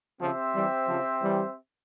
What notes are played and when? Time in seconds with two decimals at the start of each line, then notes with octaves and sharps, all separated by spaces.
0.21 C#3 F3 C4 G4 C5 E5
0.55 E3 G3
0.88 C#3 F3
1.23 E3 G3